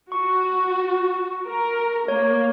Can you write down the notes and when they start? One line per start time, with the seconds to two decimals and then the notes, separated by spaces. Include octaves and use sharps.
0.12 F#4 C#6
1.46 A#4
2.08 A#3 C#5